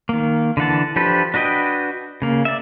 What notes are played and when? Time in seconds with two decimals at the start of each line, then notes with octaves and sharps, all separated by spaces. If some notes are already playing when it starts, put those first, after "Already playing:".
0.09 D#3 A#3
0.57 D3 E3 F#5 A5
0.96 F3 D4 G4 A4 B4
1.34 D4 F#4 B4 D#5 G5
2.22 C#3 A#3
2.45 D5 E5